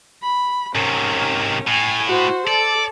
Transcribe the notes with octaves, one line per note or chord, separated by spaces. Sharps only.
B5
G#2 C3 C#4 A#4
A2 G#5
F#4 C5
A4 D5